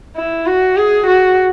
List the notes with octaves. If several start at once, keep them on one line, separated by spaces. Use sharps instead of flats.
E4
F#4
G#4
F#4